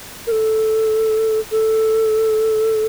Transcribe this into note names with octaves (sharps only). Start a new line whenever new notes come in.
A#4
A4
A4